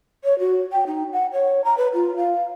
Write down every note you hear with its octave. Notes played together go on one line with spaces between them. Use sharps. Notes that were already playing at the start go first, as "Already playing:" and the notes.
C#5
F#4
G5
D#4
F#5
C#5
A#5
B4
F4
F5